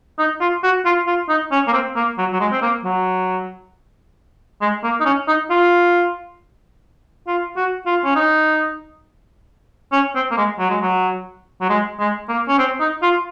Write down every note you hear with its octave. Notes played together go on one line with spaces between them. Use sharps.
D#4
F4
F#4
F4
F4
D#4
C#4
A#3
C4
A#3
F#3
F#3
G#3
C4
A#3
F#3
G#3
A#3
D#4
C#4
D#4
F4
F4
F#4
F4
C#4
D#4
C#4
C4
A#3
G#3
F#3
G#3
F#3
F#3
G#3
G#3
A#3
C#4
C4
D#4
F4